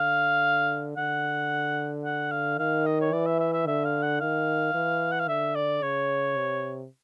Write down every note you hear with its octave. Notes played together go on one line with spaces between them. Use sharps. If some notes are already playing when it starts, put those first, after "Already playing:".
Already playing: D3 F5
D3 F#5
F#5
F5
D#3 F5
D#5
C#5
E3 D5
E5
E5
E5
D3 E5
F5
F#5
D#3 F5
E3
F#5
F5
D3 E5
D5
C#3 C#5
C3